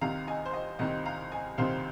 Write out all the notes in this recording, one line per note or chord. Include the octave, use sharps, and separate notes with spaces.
C2 C3 D#3 C4 F5 A#5
D#5 G#5
C5
D#5
C2 C3 D#3 C4 D#5
F5 A#5
D#5 G#5
C2 C3 D#3 C4 C5 F5